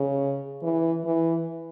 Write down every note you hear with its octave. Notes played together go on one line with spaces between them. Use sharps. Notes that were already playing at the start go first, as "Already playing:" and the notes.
Already playing: C#3
E3
E3